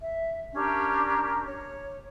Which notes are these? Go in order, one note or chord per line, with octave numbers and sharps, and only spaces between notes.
E5
C#4 D4 G4 A#4
C#5